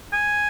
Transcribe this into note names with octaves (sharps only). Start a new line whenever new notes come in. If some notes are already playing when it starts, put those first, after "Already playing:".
G#5